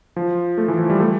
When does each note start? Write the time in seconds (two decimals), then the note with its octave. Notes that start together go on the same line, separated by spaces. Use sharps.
0.16 F3
0.58 A3
0.68 E3
0.79 F3
0.90 G3
1.00 A3